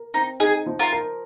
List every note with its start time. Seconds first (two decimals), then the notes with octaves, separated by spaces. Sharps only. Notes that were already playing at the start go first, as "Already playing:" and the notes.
Already playing: A#4
0.14 C4 D#4
0.40 D#4 G#4
0.66 F3
0.79 F4 A#4
0.93 A#4